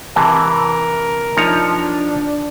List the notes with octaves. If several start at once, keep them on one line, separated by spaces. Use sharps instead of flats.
C3 E3 A#4 A5
F3 D4 D#4 C#5 D#5 A#5